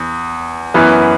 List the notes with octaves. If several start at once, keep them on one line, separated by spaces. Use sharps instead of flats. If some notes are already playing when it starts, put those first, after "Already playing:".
Already playing: E2
F#2 E3 B3